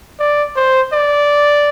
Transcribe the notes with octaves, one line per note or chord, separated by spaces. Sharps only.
D5
C5
D5